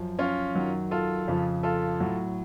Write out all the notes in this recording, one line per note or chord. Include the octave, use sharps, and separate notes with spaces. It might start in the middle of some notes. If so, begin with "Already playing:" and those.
Already playing: F#2 F3
C#4 F4
F#2 D#3 F#3
F4 A4
F2 C#3 F3
F4 A4
A2 F#3